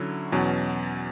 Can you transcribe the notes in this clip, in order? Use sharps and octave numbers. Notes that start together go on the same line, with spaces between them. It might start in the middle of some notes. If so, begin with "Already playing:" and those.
Already playing: D3 F#3 C#4 E4
E2 B2 F#3 C#4